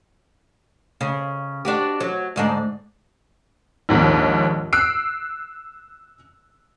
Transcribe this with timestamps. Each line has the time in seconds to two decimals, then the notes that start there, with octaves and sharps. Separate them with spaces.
1.01 C#3
1.65 D4 F#4 G4
2.01 F#3
2.36 D2 G#2 D4
3.89 A#1 D#2 G#2
4.73 E6 F#6 C7 D7